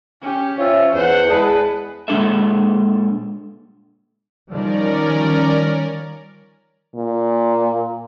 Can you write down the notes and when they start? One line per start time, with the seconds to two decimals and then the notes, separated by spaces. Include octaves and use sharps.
0.22 C#4 G4
0.58 F3 C#4 F4 C#5 E5
0.94 E2 C5 F#5
1.30 E2 G#3 G#4 B4 A5
2.08 A#2 G#3 D4 A4 E5
4.50 D#3 F3 G3 C#4 A#4 D5
6.95 A#2